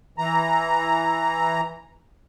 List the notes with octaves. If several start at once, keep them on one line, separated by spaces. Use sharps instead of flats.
E3 A#5